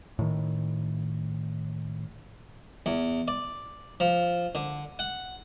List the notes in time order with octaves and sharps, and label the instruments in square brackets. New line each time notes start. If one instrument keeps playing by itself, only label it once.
[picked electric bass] A2 D#3
[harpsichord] E2
D5
F3
D3
F#5